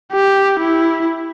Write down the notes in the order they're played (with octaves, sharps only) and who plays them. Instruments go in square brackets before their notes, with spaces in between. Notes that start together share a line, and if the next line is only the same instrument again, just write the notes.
[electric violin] G4
E4